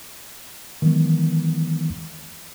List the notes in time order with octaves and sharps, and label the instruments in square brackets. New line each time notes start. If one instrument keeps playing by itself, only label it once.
[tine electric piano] D#3 E3 F#3 G#3 B3